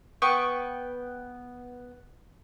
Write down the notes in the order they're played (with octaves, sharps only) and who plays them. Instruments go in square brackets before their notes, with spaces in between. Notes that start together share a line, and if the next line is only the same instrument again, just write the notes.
[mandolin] B3 G5 C#6